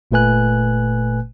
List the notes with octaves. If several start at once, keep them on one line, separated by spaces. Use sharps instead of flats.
G1 A#2 A3 B4 G#5 F#6